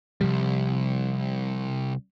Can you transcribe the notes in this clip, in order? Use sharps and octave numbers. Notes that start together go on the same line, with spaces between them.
C2 C3 F3 G3